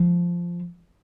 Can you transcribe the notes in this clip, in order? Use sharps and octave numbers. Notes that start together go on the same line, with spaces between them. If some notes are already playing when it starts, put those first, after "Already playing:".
Already playing: F3